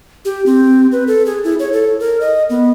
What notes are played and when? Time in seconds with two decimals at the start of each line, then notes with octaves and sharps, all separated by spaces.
0.25 G4
0.46 C4
0.92 B4
1.07 A4
1.26 G#4
1.44 E4
1.59 C#5
1.73 A4
2.00 A#4
2.21 D#5
2.50 B3